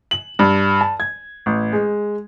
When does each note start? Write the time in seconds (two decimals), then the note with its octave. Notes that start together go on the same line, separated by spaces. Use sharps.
0.11 F#7
0.39 G2
0.81 A5
1.00 G#6
1.46 A1
1.73 G#3